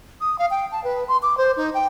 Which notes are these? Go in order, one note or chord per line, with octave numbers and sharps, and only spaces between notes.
D#6
F5
G5
A5
B4
C6
D6
C5
D#4
G5